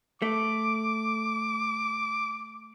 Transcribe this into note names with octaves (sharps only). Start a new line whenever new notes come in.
A3 D6